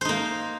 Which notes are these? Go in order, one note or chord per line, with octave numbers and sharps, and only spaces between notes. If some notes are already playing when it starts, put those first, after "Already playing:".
A#3 D#4 C5